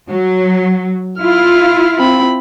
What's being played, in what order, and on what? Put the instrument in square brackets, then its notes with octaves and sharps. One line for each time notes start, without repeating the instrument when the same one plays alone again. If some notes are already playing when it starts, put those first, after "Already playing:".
[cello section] F#3
[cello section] E4 F4 [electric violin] F6
[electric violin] C4 B5